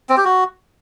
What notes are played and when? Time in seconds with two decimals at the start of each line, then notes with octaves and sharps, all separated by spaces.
0.09 C4
0.17 G4
0.25 F#4